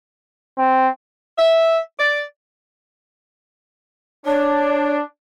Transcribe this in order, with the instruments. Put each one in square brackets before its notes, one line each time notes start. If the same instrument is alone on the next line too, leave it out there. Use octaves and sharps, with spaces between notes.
[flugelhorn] C4
[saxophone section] E5
D5
[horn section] D4 [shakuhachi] C#5